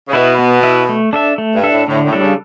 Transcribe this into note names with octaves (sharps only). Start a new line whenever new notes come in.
C#3
B2 E4 B4 E5
B3
E4 B4 E5
A3
D4 A4 E5
A3
G2
D4 A4 E5
A2
A2 D3
A2
G3 D4 A4
C#3